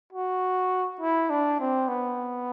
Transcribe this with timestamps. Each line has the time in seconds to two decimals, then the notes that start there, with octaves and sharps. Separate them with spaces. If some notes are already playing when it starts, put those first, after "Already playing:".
0.13 F#4
1.01 E4
1.30 D4
1.60 C4
1.88 B3